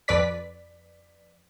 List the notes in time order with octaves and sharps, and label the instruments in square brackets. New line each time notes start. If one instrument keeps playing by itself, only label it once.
[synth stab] F2 B4 D5 B6